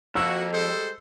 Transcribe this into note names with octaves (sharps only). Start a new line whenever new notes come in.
F2 A#3 F#4 E6 E7
G3 G#3 A4 C5